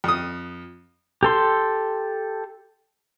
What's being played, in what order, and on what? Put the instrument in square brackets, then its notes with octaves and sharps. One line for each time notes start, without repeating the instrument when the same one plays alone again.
[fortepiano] F2 D#6
[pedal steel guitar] G4 A4 C6